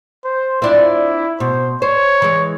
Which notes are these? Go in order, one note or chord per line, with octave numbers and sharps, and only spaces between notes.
C5
C4 D4 E4 F4
B2 C5
C5 C#5
E3 G#3